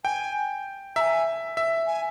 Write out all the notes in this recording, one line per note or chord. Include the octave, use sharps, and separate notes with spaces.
G5 G#5
E5 G#5 A#5
E5
G#5